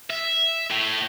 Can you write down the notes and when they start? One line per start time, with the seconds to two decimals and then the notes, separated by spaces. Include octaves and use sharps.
0.10 E5
0.71 A2